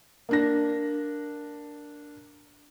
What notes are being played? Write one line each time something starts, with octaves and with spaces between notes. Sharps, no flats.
A#3 D4 A#6